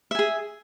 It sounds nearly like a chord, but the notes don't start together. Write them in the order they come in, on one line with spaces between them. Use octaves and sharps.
E5 G#5 G#4